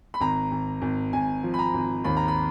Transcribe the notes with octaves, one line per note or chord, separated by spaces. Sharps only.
B5
G#1 A#5
G#1
G#1
G#1 G#5
F3
B5
A#5
G#1
D#2 B5
A#5
B5